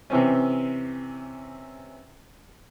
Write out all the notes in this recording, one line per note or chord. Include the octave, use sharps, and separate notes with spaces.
C3 E3 C4 C#4